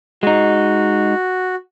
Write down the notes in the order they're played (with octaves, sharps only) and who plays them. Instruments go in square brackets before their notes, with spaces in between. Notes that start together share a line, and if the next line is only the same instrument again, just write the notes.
[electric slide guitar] G#3 D#4 [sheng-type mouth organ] F#4